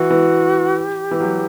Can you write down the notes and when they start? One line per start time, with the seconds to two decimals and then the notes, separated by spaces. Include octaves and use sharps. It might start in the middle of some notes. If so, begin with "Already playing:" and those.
Already playing: E3 F#4
0.10 E3
0.77 G4
1.11 E3
1.21 F#3